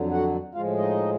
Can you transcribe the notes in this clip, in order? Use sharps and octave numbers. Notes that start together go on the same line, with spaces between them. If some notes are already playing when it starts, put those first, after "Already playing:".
Already playing: F2 D3 F#3
F#4 F#5
A2 F3 G#3 F4 F5
D#4 D#5